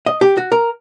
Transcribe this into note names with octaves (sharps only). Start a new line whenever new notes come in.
D#5
G4
F#4
A#4